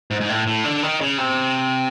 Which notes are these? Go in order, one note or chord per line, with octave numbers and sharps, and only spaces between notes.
G#2
G#2
A2
A2
D3
D#3
C#3
C3